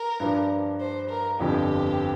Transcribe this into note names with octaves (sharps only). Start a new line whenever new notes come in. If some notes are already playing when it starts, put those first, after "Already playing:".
Already playing: A#4
G2 F3 D4
C5
A#4
G1 F2 D3 F3 G4